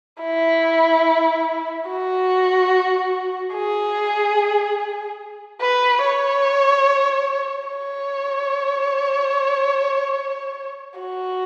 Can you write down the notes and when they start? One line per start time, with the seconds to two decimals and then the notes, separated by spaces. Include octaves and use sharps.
0.22 E4
1.89 F#4
3.53 G#4
5.61 B4
6.02 C#5
7.68 C#5
10.99 F#4